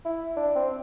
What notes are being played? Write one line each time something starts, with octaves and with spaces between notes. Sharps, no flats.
E4
D4
C4